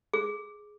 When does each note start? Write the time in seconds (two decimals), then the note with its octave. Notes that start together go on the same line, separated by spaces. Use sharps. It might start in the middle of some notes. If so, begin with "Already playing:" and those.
0.14 G#4